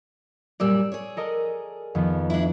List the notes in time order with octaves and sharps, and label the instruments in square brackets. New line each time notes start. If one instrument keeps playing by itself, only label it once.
[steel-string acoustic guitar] F#2 A#2 G3 [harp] D5 E6
[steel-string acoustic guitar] G#4 C#5
[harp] A4 A#4 D#5
F2 D#3 B3
[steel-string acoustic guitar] D4 E4